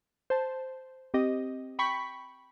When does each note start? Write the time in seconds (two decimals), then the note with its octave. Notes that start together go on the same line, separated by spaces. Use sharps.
0.30 C5 A5
1.14 C4 G4 D#5
1.79 G5 B5 C#6 B6